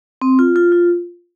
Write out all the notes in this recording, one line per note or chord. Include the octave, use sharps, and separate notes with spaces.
C4
F4
F4
F4